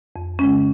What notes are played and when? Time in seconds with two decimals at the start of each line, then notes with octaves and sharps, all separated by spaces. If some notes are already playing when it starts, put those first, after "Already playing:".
0.16 F2
0.39 C#3 G#3 C#4